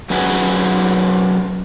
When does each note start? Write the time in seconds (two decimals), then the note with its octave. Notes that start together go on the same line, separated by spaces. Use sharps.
0.10 F#3 C#4 G#4 B4 F#5